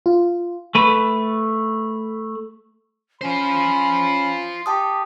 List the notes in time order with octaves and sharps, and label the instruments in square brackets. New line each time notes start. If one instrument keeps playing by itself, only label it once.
[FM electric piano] F4
[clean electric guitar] A3 B4
[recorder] C#4 [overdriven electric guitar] F4 C5 [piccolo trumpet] B5
[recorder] G4 [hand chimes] G5 A5 D#6